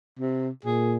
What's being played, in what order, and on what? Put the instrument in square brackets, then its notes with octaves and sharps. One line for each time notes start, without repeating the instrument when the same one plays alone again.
[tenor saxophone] C3
[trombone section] A#2 [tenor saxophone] G#4